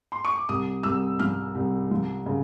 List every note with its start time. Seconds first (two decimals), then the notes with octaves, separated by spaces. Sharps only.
0.12 C6
0.25 C#6
0.36 D6
0.49 C2 D#6
0.83 C2 E6
1.19 F3 F6
1.55 C2
1.91 F3
2.26 C#3